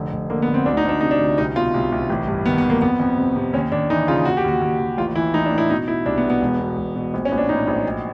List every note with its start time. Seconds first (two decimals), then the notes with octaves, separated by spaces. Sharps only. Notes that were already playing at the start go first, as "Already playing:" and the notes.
Already playing: F1 D3
0.12 F1
0.30 D3 A#3
0.42 B3
0.48 D3
0.54 C4
0.66 D2 D4
0.77 D#4
0.84 D2 D4
1.01 C3 D#4
1.11 D4
1.20 D2
1.38 C2 D#4
1.56 B2 F4
1.74 C2
1.92 C2
2.10 A1
2.28 G2
2.45 D#3 B3
2.58 B3
2.64 D#3
2.70 A#3
2.82 F2 B3
3.00 F2
3.18 C3
3.36 C3
3.53 D#2 C#4
3.72 D#2 D4
3.90 E3 D#4
4.08 C#3 F4
4.25 D#2 F#4
4.37 G4
4.44 D#2 F#4
4.62 D#2
4.79 D#2
4.98 A1 F4
5.15 E3 E4
5.34 A1 D#4
5.46 D4
5.52 A2
5.58 E4
5.70 B2 D#4
5.87 B2 E4
6.06 C2 D4
6.18 B3
6.24 B2
6.30 B3
6.42 E1
6.59 B2
6.78 E1
6.96 B2
7.14 A#1
7.25 C#4
7.32 A#1
7.38 D4
7.49 A2 D#4
7.67 A#1
7.85 B1